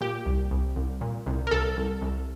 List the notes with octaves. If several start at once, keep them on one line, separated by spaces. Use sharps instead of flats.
A#2 G4
C2
C2
C2
A#2
C2
A#4
C2 A4
C2
C2